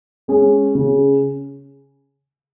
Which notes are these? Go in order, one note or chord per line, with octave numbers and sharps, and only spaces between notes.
G#3 C#4 G#4
C#3